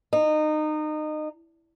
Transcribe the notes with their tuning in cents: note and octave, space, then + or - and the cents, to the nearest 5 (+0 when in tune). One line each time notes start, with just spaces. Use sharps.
D#4 -25